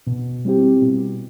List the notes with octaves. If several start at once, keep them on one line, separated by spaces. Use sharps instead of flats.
B2
G3 C4 E4 G4
B2